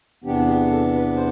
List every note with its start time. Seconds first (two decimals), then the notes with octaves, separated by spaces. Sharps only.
0.24 E2 C3 E3 B3 D4 G4
0.48 G4
0.70 A4
0.94 B4
1.16 C5